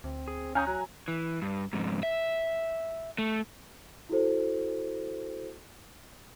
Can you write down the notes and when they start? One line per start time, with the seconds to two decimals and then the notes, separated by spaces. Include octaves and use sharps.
0.04 D2 C4
0.28 G#4
0.55 C#4 F5 G5 G#5 A#5 D#6
0.67 F#3 F#6
1.08 E3
1.42 G2
1.73 F2 G#2
2.03 E5
3.18 A3
4.09 E4 F#4 A4 C5